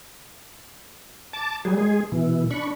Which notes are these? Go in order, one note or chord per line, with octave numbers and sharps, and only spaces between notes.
A5 D6 A6
F#3 G3 G#4
G#3 G#4
B2 E3
D4 B5 C#6